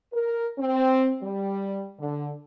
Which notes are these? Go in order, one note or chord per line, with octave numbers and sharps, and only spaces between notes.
A#4
C4
G3
D3